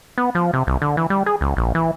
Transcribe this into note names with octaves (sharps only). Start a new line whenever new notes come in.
B3
F3
C3
C2
D3
E3
G3
G#4
C#2
A#1
E3